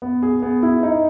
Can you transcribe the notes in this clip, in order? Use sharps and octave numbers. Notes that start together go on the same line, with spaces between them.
B3
G#4
B3
E4
D#4